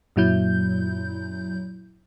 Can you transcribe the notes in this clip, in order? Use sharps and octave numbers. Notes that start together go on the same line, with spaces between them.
F#2 A#2 F#3 E4 G6